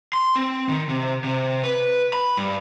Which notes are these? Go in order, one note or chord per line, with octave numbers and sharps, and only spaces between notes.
C6
C4
D#3
C3
C3
B4
B5
G2